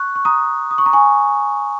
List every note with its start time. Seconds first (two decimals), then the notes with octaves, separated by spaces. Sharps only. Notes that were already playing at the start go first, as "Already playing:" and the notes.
Already playing: C#6 F#6
0.16 C#6
0.25 A#5 D#6
0.71 D#6
0.78 C#6
0.86 A#5
0.93 G#5 C#6